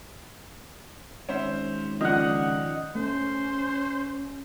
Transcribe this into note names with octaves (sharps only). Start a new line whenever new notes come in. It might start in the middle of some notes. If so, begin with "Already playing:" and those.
G#1 C#4 C5 E5
C#2 D#3 F3 D4 D#5 F#5
A3 C#4 C5